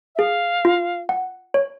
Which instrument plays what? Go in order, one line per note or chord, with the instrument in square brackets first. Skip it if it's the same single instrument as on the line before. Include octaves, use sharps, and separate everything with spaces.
[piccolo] E5
[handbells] G#4 [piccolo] F5
[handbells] F4
F#5
C#5